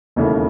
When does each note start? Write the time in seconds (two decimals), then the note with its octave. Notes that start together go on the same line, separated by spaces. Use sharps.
0.16 E1 D#2 C#3 E3 A3